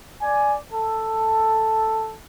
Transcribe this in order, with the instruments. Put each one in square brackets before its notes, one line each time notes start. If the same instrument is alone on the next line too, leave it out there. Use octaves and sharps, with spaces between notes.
[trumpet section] D5 G#5
A4